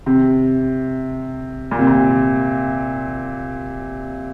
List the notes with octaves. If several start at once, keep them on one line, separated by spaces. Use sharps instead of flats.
C3
A#2
C3
A#2